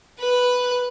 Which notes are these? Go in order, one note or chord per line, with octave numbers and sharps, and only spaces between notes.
B4